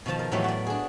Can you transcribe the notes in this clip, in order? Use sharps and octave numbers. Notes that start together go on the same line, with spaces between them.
B2 D#3 F3 A5
A#4
A2 E3 F#3 A3 B3 G4
F#4 D5
D4 G#4